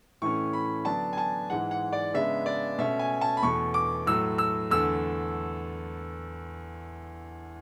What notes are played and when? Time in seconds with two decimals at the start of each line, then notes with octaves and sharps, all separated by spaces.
0.22 A2 E3 A3 C#4 C#6
0.53 B5
0.85 D3 F#3 B3 D4 A5
1.13 G#5
1.18 A5
1.50 G#2 E3 G#3 F#5
1.71 F#5
1.93 D5
2.14 C#3 G#3 B3 D4 E5
2.46 D5
2.78 B2 A3 C#4 E5
2.99 G#5
3.21 A5
3.37 B5
3.42 E2 B2 A3 C#6
3.74 D6
4.06 A2 F#3 A3 E6
4.38 E6
4.70 E2 D3 A3 E6